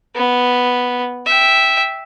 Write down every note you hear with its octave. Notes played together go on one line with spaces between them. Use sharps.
B3
E5 G5